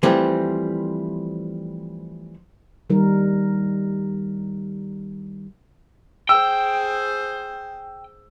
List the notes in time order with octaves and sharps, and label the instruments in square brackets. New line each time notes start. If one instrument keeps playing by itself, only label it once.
[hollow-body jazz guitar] E3 F3 G3 A3 C4
[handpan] D#3 G3 D#4 A#4
[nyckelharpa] G#4 C5 [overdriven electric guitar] G5 [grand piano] E6